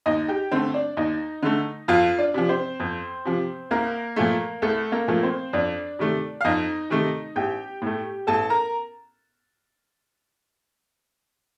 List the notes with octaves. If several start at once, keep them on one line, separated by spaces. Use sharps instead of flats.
D#2 D#4 D#5
G4 G5
D3 A3 C4 C5
D4 D5
D#2 D#4 D#5
D3 A3
F2 F4 F5
D4 D5
C3 F3
C4 C5
F2
C3 F3
C2 A#3 A#4
A#2 F3 A3
C2 A3 A4
A#3 A#4
A#2 F3 A3
C4 C5
F2 D4 D5
C3 D#3 A3
F5
F2 D#4 D#5
C3 D#3 A3
A1 G4 G5
A2 A3
A1 A4 A5
A#4 A#5